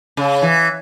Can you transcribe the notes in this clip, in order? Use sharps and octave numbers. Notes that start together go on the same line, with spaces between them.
C#3
E3